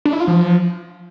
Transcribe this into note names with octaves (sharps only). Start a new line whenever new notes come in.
D4
E4
F4
F3